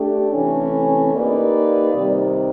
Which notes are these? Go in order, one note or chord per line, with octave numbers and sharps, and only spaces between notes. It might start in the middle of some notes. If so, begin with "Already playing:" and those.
Already playing: A3 D4 G4
C3 E3 A3 C#4
A#3 D#4 G4 B4 D5
C3 D#3 G3